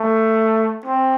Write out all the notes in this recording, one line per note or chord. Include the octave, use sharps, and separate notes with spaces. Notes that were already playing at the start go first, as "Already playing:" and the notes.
Already playing: A3
C4